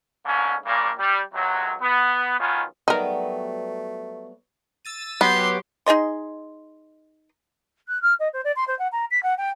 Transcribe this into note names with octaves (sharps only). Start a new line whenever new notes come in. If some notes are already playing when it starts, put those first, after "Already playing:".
G#2 D3 A#3 C#4
A#1 A#2 C#3 G3 A#3
G3
C#2 F#2 C3 F#3
B3
B1 D#3 B3 C#4 F4
F#3 G3 A3 B3 D#4 A#4
E6 A6 D#7
F#3 B3 G4 C6
D#4 G#4 D#5 C6
F#6
F6
D#5
C5
D5
C6
C5
F#5
A#5
B6
F#5
G5